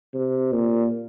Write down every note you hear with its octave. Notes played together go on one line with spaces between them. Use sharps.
C3
A#2